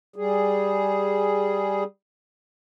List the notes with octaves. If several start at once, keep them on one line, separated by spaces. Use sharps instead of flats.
G3 G#4